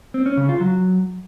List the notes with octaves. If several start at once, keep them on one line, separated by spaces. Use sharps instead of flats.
C4
C#4
C#3
F4
F#3